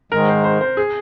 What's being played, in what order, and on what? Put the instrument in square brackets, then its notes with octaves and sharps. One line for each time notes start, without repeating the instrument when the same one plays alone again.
[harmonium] G#2 D#3 G#3 [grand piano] A#4
[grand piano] C5
C5
C5
G#4